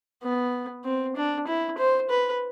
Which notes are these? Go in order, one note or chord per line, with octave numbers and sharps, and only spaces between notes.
B3
C4
D4
E4
C5
B4